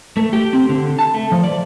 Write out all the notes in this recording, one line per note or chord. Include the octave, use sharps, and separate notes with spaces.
A3
G4
C4
D3
A5
A3
F3
D5